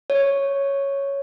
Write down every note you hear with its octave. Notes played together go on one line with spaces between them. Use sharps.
C#5